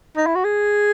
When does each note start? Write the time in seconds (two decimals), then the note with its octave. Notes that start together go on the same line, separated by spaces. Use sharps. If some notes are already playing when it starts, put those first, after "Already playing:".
0.17 D#4
0.26 E4
0.35 F#4
0.44 G#4